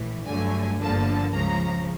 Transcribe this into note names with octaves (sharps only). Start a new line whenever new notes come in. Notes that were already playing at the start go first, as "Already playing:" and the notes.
Already playing: A#1 A2 E3
G2 D3 F#3 A3 G#5
G1 G2 D3 F3 A#3 A5
C#2 C#3 F3 A#5